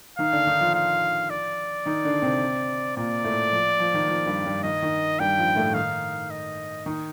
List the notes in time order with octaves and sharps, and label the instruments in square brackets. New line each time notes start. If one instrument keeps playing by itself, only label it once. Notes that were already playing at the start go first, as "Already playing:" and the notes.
[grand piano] D#3 D#4 [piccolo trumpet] F5
[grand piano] D3 D4
D#3 D#4
F3 F4
[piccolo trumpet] F5
D5
[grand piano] D#3 D#4
D3 D4
C3 C4
[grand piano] A#2 A#3 [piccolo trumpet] D5
[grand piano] A2 A3
F3
F3
D#3
F3
G2 G3
G2 G3
[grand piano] D#3 [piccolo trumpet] D#5
[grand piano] D#3
[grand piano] G2 G3 [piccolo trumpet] G5
[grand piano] F3
A2 A3
[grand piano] D#3 D#4 [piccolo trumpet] F5
[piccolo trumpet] D#5
[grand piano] D#3 D#4